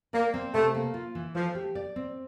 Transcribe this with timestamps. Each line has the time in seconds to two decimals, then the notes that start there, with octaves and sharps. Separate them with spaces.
0.13 A#3 D5
0.34 C4
0.54 C3 A3
0.75 A#3
0.94 F4
1.15 E3
1.35 F3 A3
1.55 G4
1.75 D5
1.96 C4